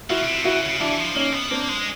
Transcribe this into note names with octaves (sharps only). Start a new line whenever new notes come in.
F3 E4 F#4
B2
C3
C#3 E4 F#4
C#3
E3 D4 E4
F3
A#3 C#4 D#4
B3
A#3 C4 D4
G#3